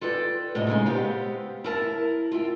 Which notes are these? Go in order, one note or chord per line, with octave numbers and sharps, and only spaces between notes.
F4 A4 B4 D5 F#5 G5
D2 A2 C3 A3 A4 D#5
A#2 C#3 G#3 D#4
B3 C4 G4 F5
E4 A#4 A5
F4 E5 G5